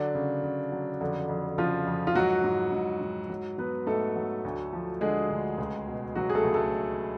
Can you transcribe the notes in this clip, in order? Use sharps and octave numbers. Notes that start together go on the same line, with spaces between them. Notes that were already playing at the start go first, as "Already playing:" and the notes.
Already playing: D3 F#3 D4
C#3
C#3
F#3
F2 D3 D4
F2
C#3 F3 F4
F2
F4
G#2 F#3 F#4
G#2
G#2
G#2
F#3
F#3 B3 B4
G#2 A3 A4
F#3
D2
F3
D3 G#3 G#4
D2
C#2
B2
C#2 F#3 F#4
G#4
A3 A4
C#2
A3 A4